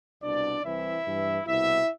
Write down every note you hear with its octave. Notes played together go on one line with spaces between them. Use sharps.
C2 B2 D4 D5
C2 C3 E3 E4 E5
G2 E3
C2 B2 E4 E5